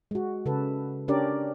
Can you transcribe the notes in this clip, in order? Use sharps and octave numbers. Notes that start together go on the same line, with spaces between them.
G#3 F#4
C#3 A4 B4
C#4 D4 G4 A#4 D5